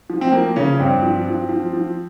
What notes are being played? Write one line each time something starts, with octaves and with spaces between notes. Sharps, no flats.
F3
C4
F3 A#3
C#3 F3 C#4
G2 C4
F3
F3
F3
F3